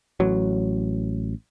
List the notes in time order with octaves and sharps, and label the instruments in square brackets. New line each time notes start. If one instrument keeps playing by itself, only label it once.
[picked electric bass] A1 F#3